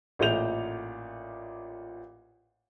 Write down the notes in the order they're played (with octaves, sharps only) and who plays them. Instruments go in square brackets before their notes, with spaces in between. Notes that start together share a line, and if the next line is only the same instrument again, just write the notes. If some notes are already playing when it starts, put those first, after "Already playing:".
[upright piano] A1 A#2 A3 G6 F7